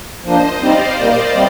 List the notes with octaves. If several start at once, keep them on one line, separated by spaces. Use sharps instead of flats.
F3 A#3 D4 C5 D#5
G3 C4 D#4 D5 F5
A#2 G3 A#3
C3 G3